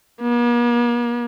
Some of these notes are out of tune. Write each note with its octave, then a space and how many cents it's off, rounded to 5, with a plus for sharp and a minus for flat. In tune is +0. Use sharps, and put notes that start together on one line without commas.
A#3 +45